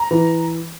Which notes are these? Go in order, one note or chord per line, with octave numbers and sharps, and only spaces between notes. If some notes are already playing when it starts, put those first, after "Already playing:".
Already playing: A#5
E3